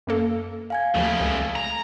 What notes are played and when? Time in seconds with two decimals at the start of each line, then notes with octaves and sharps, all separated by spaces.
0.07 F#2 A#3 A4
0.70 F5 G#5 G#6
0.95 D#2 C#3 F3 A3
1.20 C#2
1.56 A#5